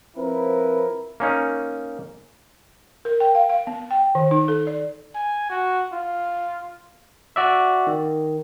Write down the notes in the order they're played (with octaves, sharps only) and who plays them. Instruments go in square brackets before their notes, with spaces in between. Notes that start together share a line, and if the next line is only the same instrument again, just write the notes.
[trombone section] F3 C4 E4 A#4 B4
[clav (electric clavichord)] A#3 C#4 D#4
[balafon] A#4
G5
F5
F5
B3
G5
D#3
D#4
A4
D5
[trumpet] G#5
F#4
F4
[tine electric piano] F#4 D5 E5
D#3